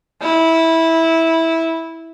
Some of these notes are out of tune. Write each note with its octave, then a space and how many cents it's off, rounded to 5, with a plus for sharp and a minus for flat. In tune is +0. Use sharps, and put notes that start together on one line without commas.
E4 -15